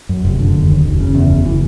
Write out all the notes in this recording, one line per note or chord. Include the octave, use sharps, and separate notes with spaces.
F#2
F1
D3
D#2
F1
F#1
C#3
E2
F#1
E3